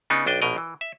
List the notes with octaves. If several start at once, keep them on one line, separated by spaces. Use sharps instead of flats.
C#3 B3 D4 D#4
B1 D4 D#5 G5
A#1 B2 A#4 D#5
E3
E5